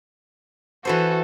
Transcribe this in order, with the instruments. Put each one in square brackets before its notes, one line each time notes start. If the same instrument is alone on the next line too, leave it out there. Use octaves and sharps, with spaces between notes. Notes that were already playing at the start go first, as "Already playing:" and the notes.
[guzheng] E3 B4 C5 [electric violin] F#4 A4